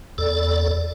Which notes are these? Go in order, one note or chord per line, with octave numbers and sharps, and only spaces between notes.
E2 A4 D5